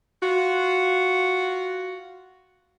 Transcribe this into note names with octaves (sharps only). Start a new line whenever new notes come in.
F4 F#4